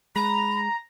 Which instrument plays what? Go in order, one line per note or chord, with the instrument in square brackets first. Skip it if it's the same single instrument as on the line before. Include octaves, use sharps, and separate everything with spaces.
[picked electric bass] G#3 [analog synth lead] A#5 [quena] B5